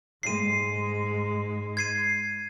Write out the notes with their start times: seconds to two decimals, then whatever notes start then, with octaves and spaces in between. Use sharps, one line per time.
0.23 G#2 G#3 C7 D#7
1.77 G#6 C7 D#7